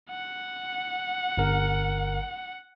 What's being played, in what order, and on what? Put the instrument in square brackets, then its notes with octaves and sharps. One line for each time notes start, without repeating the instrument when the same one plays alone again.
[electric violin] F#5
[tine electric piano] G1 A#4